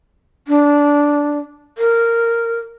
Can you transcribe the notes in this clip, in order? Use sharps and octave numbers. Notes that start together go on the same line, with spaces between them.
D4
A#4